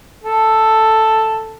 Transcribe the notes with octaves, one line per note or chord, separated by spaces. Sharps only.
A4